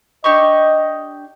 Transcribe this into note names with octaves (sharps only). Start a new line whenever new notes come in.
D4 G4 D#5 C#6